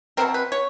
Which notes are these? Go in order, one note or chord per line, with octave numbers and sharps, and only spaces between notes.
B2 G3 C4 A#4
B4
C#5